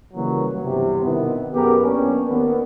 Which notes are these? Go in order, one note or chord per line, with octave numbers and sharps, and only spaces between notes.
C#3 E3 F#3 G3 A#3
E2 G2 C3
B2 D#3 B3 E4
F#2 B3 G4 G#4 A#4
A#3 B3 C#4 D4
D#2 A#3 B3